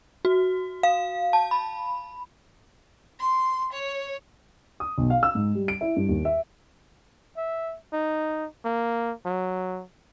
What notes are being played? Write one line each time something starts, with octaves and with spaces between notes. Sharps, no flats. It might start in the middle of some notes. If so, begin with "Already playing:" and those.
F#4
F5
A5
B5
C6
C#5
D#6
B1
F5
E6
G#2
G3
D7
E4
G2
D#2
E5
E5
D#4
A#3
F#3